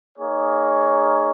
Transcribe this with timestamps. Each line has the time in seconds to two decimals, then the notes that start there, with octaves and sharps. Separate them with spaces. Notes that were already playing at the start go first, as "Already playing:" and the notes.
0.17 A#3 D#4 G#4 C#5